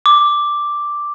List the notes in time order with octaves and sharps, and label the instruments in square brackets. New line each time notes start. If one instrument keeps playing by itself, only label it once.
[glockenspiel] D6